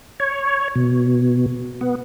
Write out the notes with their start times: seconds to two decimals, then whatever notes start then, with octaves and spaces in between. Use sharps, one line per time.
0.20 C#5
0.75 B2
1.81 B3